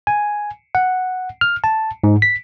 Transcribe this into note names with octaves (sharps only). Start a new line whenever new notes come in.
G#5
F#5
F6
A5
G#2
B6